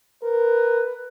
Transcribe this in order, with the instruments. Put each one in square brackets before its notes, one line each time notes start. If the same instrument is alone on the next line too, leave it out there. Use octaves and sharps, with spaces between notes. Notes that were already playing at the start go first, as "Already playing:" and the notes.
[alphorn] A#4 [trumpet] B4